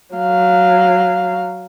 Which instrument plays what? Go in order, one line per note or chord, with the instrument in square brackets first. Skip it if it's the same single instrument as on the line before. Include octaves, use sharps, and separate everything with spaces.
[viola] F#3 F5